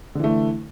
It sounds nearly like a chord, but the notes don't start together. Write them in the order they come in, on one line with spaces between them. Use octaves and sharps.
D3 E3 A3